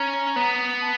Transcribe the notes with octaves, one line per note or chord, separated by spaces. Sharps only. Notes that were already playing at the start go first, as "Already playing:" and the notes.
Already playing: C#4 A#5
B3
A5